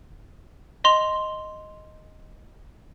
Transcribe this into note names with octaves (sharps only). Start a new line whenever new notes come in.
D#5 C6 F7